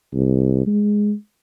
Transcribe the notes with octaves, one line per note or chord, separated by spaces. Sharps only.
C2
G#3